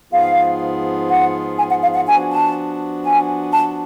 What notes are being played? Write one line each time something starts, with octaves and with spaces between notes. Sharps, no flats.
G#2 F3 B3 F4 G#4 F5
F#5
G#5
F#5
F5
F#5
F3 B3 D4 F#4 G#5
A5
G#5
A5